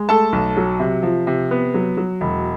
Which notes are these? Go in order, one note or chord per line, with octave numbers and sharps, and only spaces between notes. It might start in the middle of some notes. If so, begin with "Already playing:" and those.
Already playing: G#3
A3 A4 A5
B1
F#3
C3
F3
C3
B3
F#3
F#3
E1